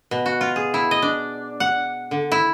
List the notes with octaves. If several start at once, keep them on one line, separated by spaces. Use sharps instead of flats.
B2
F#4
F4
G#4
E4
D#5
D4
F#5
D3
E4